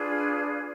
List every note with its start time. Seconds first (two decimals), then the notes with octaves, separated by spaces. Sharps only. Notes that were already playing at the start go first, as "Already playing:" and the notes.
Already playing: D4 F4 G#4 B4